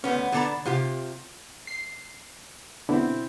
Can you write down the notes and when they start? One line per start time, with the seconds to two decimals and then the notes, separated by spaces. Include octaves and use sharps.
0.04 D2 A3 B3 C#4
0.32 D3 B3 D4 A4 A#5 B5
0.65 C3 F4 G4
1.67 C7
2.89 B2 D3 C4 E4